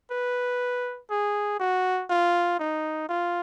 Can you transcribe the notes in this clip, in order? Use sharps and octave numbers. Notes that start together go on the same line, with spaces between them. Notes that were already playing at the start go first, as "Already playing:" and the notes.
B4
G#4
F#4
F4
D#4
F4